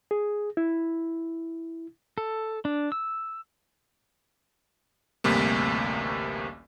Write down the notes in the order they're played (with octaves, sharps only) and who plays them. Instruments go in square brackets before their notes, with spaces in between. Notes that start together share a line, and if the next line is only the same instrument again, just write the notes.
[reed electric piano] G#4
E4
[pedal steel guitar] A4
D4
E6
[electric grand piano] A1 D2 G2 C3 A#3